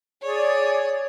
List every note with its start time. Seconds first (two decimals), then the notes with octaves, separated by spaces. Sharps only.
0.23 G#4 C#5 D5